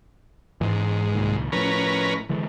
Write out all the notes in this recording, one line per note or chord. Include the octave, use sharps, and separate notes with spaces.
G#2 E3 G#3
C2 A#2 D#3
A2 F3 C#4 A#4 B4
D3 E3 G#3